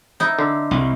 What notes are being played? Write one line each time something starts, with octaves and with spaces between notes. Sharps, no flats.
D#4 E4
D3
C2